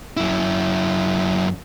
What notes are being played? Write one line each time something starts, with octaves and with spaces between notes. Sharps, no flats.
F#2 E4